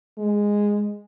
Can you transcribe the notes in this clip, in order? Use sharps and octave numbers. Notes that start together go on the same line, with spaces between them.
G#3